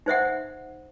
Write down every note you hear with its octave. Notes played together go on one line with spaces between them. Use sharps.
D#4 C5 E5 F#5